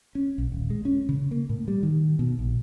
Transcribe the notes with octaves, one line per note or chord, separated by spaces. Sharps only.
C#4
B1
D#1
G#3
C#4
C#3
A#3
A2
G3
D#3
B2
A#1